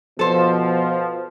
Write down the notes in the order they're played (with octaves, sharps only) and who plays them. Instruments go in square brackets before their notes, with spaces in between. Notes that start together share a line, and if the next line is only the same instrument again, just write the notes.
[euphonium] B2 [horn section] F3 [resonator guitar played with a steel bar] A4 C5